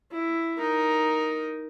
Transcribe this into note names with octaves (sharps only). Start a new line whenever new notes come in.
E4
D#4 A#4